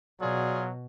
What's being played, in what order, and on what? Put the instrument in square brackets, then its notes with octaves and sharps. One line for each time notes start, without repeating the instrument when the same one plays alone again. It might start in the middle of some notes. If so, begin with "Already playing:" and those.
[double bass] B2 [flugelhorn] F#3 [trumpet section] F4 G#4 [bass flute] D5